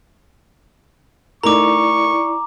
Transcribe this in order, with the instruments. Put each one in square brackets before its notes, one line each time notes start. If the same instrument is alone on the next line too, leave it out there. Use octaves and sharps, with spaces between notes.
[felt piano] A3 D#4 A#4 [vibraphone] E4 D5 [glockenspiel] A#5 D6 [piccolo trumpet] C#6